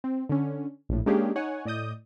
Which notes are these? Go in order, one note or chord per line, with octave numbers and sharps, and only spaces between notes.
C4
D3 C#4
A#1 A2
G#3 A#3 C#4 D4 G4 G#4
D#4 C#5 F#5 G#5
A2 D5 D#5 D#6 G6